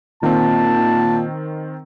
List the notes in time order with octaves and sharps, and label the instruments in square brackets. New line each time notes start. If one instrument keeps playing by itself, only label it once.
[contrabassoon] A#2 [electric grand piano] D#3 C4 [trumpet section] A5